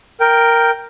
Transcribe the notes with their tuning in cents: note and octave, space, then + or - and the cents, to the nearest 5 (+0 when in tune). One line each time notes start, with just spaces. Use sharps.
A#4 +0 G5 +0